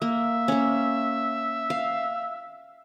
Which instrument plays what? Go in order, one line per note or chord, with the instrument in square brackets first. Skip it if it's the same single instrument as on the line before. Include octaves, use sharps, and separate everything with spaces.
[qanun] A#3 [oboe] E5
[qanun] A#3 C#4
F5